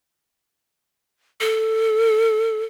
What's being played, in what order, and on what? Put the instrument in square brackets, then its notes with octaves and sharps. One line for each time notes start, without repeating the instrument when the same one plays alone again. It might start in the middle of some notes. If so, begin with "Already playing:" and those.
[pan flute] A4